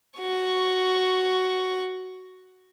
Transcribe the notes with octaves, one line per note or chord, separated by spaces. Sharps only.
F#4 C#6